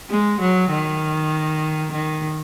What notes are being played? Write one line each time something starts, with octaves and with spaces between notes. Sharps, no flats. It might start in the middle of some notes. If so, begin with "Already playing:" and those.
G#3
F#3
D#3
D#3